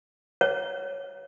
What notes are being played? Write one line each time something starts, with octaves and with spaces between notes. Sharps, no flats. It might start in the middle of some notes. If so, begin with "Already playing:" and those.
C#5